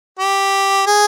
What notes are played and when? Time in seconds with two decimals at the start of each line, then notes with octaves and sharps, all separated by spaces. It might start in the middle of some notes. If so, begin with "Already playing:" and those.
0.19 G4
0.87 G#4